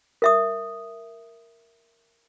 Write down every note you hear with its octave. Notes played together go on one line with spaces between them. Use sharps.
A#4 E5 D#6